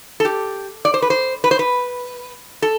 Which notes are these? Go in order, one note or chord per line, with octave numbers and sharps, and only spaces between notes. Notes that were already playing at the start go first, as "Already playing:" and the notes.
A4
G4
D5
C5
B4
C5
B4
C5
B4
A4